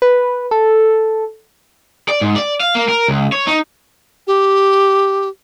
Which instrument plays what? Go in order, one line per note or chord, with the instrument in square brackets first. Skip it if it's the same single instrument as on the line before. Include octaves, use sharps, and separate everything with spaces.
[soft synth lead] B4
A4
[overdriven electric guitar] D5
G#2
D5
F5
A#3
A#4
C#2
C#5
D#4
[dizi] G4